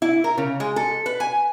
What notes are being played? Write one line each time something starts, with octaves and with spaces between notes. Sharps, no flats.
E4
A#4
C#3
G#3
A4
B4
G#5